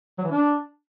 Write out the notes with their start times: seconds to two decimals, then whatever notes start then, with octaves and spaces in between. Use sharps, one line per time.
0.18 F#3
0.25 E3
0.31 D4